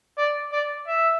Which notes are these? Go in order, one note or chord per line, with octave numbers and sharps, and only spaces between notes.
D5
D5
E5